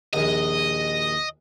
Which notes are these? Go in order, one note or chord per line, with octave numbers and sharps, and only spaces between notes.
A#1 D#2 D#5